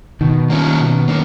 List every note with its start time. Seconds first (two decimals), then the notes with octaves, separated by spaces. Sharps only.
0.21 B2 D#3
0.50 A#3 C#4 F4
0.79 B2
1.08 A#3 C#4